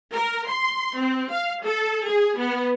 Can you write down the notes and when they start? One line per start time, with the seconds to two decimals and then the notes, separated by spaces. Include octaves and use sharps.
0.13 A#4
0.49 C6
0.98 C4
1.31 F5
1.64 A4
2.08 G#4
2.38 B3